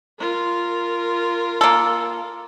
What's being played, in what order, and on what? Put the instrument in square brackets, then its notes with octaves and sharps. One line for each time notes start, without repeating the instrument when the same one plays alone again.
[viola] F4 A#4
[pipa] A#3 A4